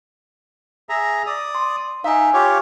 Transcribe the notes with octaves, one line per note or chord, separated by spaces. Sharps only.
G#4 E5 A#5
D5 D#6
C6
D#4 E5 F5 G#5
F4 G4 C#5